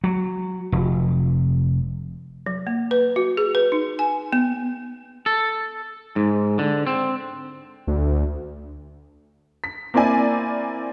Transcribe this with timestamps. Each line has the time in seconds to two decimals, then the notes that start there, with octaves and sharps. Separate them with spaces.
0.04 F#3
0.72 F1
2.46 F#3
2.67 A#3
2.91 B4
3.16 F#4
3.37 G#4
3.55 B4
3.72 D#4
3.99 G#5
4.33 B3
5.26 A4
6.16 G#2
6.59 D3
6.87 C4
7.87 D2
9.64 B6
9.94 A#3 C4 E4 D5 G#5